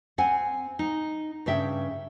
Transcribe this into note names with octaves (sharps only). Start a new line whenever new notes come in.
C4 F#5 G#5
D#4
G2 C#3 E5 G5